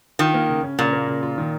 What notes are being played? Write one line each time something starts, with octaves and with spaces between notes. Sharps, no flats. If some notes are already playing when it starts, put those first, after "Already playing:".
D#3 F4
A#3
C#3
C#4
A#2 C#3
A#3
C#3
F4
D#3